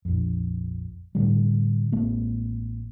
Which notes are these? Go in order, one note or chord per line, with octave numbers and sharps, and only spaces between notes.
A#1 F2
A2 D3 G3
A1 G#3 A#3 C4